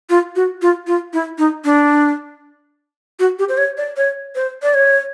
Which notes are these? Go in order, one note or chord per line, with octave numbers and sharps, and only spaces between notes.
F4
F#4
F4
F4
E4
D#4
D4
F#4
G4
C5
C#5
D5
C#5
C5
D5
C#5